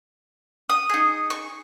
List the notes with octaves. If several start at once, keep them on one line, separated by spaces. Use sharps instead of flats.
D#6
D#4 G#4
C#6